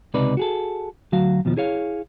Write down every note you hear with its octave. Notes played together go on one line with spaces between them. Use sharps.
C#2 C3 D#4 B4 D5
F#4 G#4 A4
D2 F#3 F#4 F5
D#2 B2 D#3 F3
E4 G#4 C#5 F5